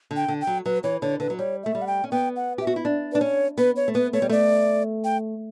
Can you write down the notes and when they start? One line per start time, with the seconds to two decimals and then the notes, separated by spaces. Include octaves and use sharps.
0.11 D3
0.16 G5
0.28 D3
0.41 G5
0.47 F#3
0.66 F#3 B4
0.83 E3 C#5
1.02 D3 C#5
1.20 D3 B4
1.30 F#3
1.39 G3 C#5
1.63 A3 E5
1.75 G3
1.82 F#5
1.87 G5
2.04 C#4
2.12 B3 G5
2.36 F#5
2.58 G4 E5
2.67 F#4
2.76 E4
2.85 D4
3.12 D4 B4
3.21 C#4 C#5
3.58 B3 B4
3.76 C#5
3.88 A3
3.94 B3 B4
4.13 A3 C#5
4.22 G3
4.29 A3 D5
5.04 G5